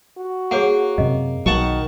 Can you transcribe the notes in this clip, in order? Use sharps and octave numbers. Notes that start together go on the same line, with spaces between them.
F#4
A#3 G#4 C#5 F#5
F#2 C3 D#5
B1 D#3 F#3 F#5 A5 C#6